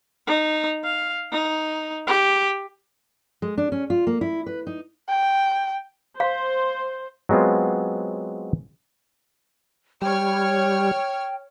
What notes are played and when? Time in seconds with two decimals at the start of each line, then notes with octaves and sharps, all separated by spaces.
0.27 D#4
0.84 F5
1.32 D#4
2.07 G4
3.42 G#3
3.58 D4
3.72 C#4
3.90 F4
4.07 A#3
4.21 E4
4.46 B4
4.67 D#4
5.08 G5
6.20 C5 F5
7.29 F#3 G#3 B3 C4 F4
10.02 G3 C#5 G5 F6 G#6